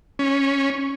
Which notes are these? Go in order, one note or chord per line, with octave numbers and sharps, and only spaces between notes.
C#4